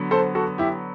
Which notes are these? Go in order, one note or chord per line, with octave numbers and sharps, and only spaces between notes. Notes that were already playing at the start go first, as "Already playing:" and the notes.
Already playing: D3 F#3 B3
A4 C5
F#4 A4
E4 G4